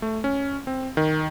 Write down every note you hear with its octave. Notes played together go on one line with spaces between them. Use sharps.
A3
C#4
C4
D#3